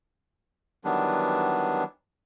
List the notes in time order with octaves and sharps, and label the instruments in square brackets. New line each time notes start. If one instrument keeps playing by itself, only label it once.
[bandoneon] D#3 E3 F#3 G3 B3 D4